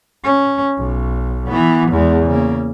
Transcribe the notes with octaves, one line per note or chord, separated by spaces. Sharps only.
C#4
B1
E3 B3
E2 G#3
C#3 A#3